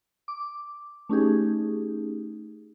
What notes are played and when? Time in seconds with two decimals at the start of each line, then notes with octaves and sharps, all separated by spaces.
0.28 D6
1.09 A3 C#4 D#4 G4 G#4